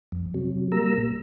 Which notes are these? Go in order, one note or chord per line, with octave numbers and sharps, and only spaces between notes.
F2
C3 F#3
G3 A#3 A#5 E6
A#2